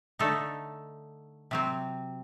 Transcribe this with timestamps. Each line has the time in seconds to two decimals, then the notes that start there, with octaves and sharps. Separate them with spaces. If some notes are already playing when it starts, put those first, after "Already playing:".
0.19 D3 A3 D#4 A4
1.51 C3 F#3 C4